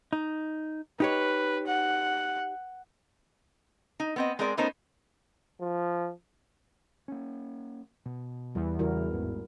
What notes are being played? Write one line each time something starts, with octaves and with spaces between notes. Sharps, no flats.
D#4
D#4 G4 B4 C#5
F#5
D#4
B3 C4 D#5
G#3 C4 G#4 A#4 D5
A3 B3 C#4 D#4 A#4 C5
F3
A#3 C#4
B2
E2 G3
C#3 E3 G3 E4 F#4 A#4
A1 G#2